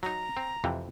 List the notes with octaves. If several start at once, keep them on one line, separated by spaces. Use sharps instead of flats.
F#3 D#4 A#5
C4
F2 C3 E3